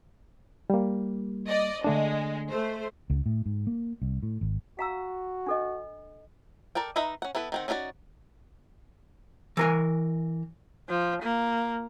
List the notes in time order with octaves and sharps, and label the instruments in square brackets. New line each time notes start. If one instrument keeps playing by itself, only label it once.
[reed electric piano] G3 A#3
[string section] D5 D#5
[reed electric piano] D3 A3 D4 [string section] G#3
[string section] A3 C5
[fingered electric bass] C#2
A2
G#2
A#3
C2
A2
G#1
[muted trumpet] F#4 [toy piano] F5 A#5 E6
[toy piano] D4 A4 D#5
[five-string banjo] A4 A#4 D5 G5
D#4 B4 D#5 E5 A#5
C#4 F#5
B3 E4 A4 B4
D#3 C4 F#5
C#4 D#4 F#4 A#4 D5
[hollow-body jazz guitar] E3 A#4 G#5
[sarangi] F3
A#3